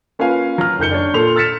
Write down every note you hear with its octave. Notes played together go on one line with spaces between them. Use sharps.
A#3 C#4 F4 B4 F5 G#5
F#3 F6
F#1 D#3 G6 C#7 G7
D4 C#5
A#2 A4 C6 F7
E6 F6 A6 B6 C#7 E7